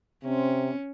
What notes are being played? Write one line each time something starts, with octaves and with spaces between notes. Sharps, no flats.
C3 C4 C#4